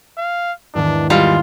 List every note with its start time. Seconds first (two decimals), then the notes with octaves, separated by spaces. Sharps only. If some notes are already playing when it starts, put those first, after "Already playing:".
0.17 F5
0.75 E2 G#2 D#3 D4
1.10 G3 G#3 F4